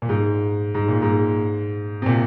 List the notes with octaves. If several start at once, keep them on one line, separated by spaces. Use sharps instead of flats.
A#2
G#2
G#2
A#2
G#2
C3
A#2